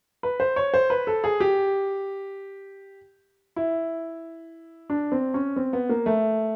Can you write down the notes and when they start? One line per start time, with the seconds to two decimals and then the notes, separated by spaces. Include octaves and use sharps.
0.23 B4
0.40 C5
0.56 C#5
0.74 C5
0.90 B4
1.07 A4
1.24 G#4
1.40 G4
3.56 E4
4.90 D4
5.12 C4
5.34 C#4
5.56 C4
5.73 B3
5.89 A#3
6.06 A3